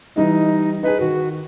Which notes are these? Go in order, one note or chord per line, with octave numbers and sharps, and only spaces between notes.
E3 G3 D#4 D#5
D#4 G#4 B4
D#3 F#4